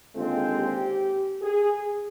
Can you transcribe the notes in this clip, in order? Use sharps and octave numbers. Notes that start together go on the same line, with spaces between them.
D#2 D3 G#3 C4 F4
G4
G#4